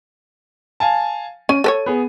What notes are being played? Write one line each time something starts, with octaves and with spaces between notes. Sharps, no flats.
F5 G#5 A5
C#4 D#7
A4 B4 C#5
B3 G#4